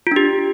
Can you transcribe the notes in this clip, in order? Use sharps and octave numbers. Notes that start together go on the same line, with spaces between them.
D4 F4 G4